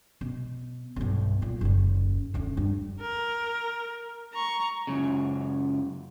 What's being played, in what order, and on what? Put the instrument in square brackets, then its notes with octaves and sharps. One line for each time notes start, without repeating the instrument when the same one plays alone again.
[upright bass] B2
B1 G2
A#2
F#1 D#2
D#1 D2
G2
[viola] A#4
A#5 C#6
[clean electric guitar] C#2 F#2 C#3